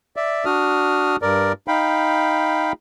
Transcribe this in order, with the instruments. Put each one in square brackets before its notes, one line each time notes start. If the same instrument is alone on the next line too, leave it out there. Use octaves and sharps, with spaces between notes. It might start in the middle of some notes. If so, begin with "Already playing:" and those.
[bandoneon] D5 E5
D4 F#4 D#6 F6
G2 A#4 D5
D#4 F5 G5 B5